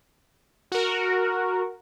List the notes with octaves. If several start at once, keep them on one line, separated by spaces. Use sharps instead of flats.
F#4 A#4